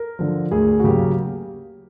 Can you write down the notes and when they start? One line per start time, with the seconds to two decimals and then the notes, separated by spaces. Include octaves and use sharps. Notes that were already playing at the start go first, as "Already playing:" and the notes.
Already playing: A#4
0.19 D3 F3
0.51 D2 G#4
0.80 F#4
0.84 C#3 F#3 A#3 G4